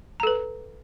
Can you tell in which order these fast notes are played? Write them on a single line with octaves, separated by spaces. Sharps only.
A#5 A4 B4